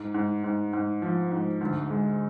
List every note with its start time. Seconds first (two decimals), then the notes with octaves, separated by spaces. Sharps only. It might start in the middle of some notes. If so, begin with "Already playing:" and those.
Already playing: G#2
0.14 G#2
0.44 G#2
0.73 G#2
1.02 F3
1.32 G#2
1.61 D2
1.90 G#3